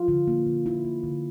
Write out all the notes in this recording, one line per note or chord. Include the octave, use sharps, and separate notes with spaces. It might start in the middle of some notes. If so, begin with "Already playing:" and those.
Already playing: F4
D3
A#3
D3
D3 E4
A#3
D3